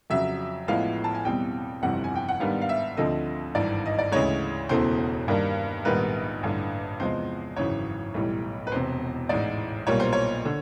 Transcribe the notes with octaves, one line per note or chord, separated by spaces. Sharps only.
F2 C#3 F#3 E5
A1 A2 F3 G#3 B3 F5
A5
G#5
E2 B2 G3 C4 G5
G1 F2 C3 E3 G3 F#5
G#5
G5
F#5
G#2 D#3 G3 B3 D4 F5
F5
E5
D2 D3 F3 A3 C4 D#5
G#1 G2 E3 D5
D#5
D5
D2 C#3 E3 G#3 C#5
E1 E2 C#3 E3 A3 C5
G2 D#3 G3 A#3 D4
A#1 G#2 D#3 G3 B3 B4
A1 G2 D3
E2 C3 F3 G#3 C5
G#1 F#2 C#3 E3 C#5
B1 A2 E3 G3
B4
E1 E2 C3 C5
A1 G#2 E3 G#3 D5
B1 A#2 G3 A#3 C#5
C5
C#5
D3